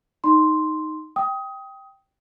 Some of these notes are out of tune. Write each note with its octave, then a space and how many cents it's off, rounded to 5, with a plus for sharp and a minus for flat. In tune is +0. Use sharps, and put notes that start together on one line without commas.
D#4 +0 D5 +0 C6 +0
G5 +0 D#6 +20